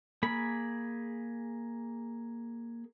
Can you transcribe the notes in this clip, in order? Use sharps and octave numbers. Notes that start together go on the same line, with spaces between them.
A#3 G#4 B5